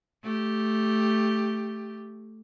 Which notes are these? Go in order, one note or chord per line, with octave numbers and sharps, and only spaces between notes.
A3 G4